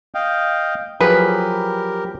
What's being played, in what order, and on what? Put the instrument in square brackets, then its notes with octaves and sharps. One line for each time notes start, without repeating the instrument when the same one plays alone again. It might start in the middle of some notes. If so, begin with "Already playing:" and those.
[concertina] D#5 F5 G5
[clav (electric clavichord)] F3 F#3 G#4 [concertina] G4 A#4 [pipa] B4